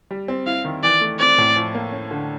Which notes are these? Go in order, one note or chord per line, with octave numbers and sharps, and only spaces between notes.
G3
C4
E4 F5
D#3
E3 D5
A3
C4 D5
A2
F3
A#3
C#4
D3